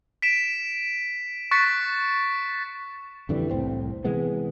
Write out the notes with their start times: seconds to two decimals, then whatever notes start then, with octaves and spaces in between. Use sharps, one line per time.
0.22 B6 D7 E7
1.51 C#6 F#6 A6 B6 C#7
3.29 F2 D3 E3 G3
3.51 C2 A2 C4
4.04 C3 E3 G#3 B3